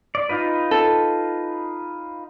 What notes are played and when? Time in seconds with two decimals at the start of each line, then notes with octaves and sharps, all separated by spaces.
0.15 D5
0.29 D#4 F4 B4
0.71 A4